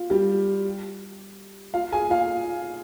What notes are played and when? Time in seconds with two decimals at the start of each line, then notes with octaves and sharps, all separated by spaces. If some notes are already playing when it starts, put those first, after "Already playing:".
Already playing: F4
0.10 G3 G4
1.74 F4 F5
1.92 G#4 G#5
2.10 F4 F5